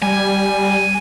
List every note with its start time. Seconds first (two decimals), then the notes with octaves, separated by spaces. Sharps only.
0.02 G3 G#5